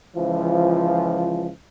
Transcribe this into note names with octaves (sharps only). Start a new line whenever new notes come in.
C#2 E3 F3